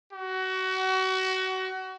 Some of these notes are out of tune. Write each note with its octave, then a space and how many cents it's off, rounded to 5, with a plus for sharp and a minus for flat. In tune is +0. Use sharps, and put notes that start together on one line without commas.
F#4 +25